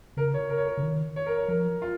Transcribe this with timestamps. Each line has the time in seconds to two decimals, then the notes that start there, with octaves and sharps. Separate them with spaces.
0.17 C#3 A#4
0.34 C#5
0.50 A#4
0.58 C#5
0.66 A#4
0.77 C#3
0.83 D#3
1.16 C#5
1.26 A#4
1.37 C#5
1.48 F3 A#4
1.82 F4